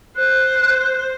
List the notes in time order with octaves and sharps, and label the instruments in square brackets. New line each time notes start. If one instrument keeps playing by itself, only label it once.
[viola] C5 [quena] F#6